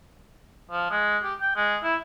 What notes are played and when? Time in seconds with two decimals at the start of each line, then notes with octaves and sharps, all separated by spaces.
0.71 F3
0.91 G#3
1.23 G4
1.41 G5
1.56 G#3
1.83 E4